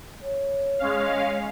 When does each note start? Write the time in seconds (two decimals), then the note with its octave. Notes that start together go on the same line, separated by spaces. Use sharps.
0.22 C#5
0.79 G#3 C#4 F5